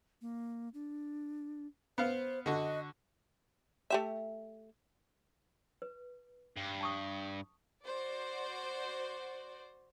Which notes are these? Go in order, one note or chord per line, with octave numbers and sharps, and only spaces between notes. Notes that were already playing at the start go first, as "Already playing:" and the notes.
A#3
D4
B3 C5 F5
D3 F#4 D#5
A3 G4 E5
B4
G2
A5 C#6 D#6
F#4 C5 D5